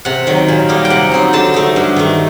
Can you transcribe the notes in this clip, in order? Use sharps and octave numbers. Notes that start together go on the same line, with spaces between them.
C3 F#5
D#3 F#3
A#2
G3 A#3 D#4
G5
C3 F#5
F#3 C4 D#4
D3 A5
A3 D#4
G2
D#3 A3